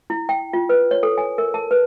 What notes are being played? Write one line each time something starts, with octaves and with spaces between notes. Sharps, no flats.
E4
G5
F4
B4
C#5
A4
G#5
A#4
A5
B4